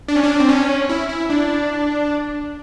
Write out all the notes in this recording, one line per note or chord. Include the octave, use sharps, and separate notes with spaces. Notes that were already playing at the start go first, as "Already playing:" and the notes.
D4
C#4
D4
C4
C#4
E4
E4
D4